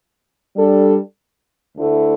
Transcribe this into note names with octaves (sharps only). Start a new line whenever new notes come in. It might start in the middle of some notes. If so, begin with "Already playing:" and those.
G3 D4 A4
D2 D3 A3 E4